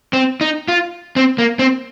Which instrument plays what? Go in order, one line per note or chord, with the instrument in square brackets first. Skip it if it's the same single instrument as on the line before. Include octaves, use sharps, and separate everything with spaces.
[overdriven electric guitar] C4
D#4
F4
C4
A#3
C4